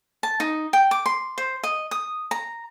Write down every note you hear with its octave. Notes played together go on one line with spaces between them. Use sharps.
A5
D#4
G5
D6
C6
C5
D#5
D#6
A#5